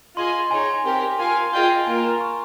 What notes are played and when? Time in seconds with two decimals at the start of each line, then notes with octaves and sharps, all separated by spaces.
0.17 F4 G#4 D#5 G#5 C6
0.51 D#4 G#4 C#5 G#5
0.66 G#5
0.85 C4 G4 A#4
1.19 F4 A#4 F5 G#5 C6
1.53 F4 G#4 D#5 G5
1.87 A#3 F4 A#4 G#5
2.04 A#5
2.21 C#6